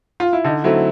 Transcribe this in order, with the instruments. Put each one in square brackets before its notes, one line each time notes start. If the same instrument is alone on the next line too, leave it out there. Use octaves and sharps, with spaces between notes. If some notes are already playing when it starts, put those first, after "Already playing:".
[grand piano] F4
E4
[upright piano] D3 [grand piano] D#4
[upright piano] F#3 A3 C4 [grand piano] E4